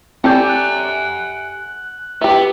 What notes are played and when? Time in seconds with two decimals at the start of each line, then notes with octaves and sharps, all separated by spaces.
0.24 C4 G4 A4 D5 F#5 G#5 G6
0.49 F#6
2.21 B3 G4 E5